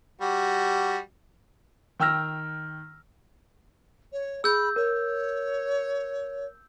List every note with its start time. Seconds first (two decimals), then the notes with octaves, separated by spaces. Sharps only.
0.21 G3 F#4
1.99 D#3 G5 E6 F6 A#6
4.12 C#5
4.44 G#4 B5 E6 G6
4.76 A#4 C#5